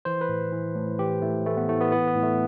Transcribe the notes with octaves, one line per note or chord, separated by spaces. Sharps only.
E3 C5
B4
A2
E3
A2
E3 G4
A2 A3
E3 A3
B3
A2 A3
B3
E3 B3
B3
A2
A3